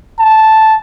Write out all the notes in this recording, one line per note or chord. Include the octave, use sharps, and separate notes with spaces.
A5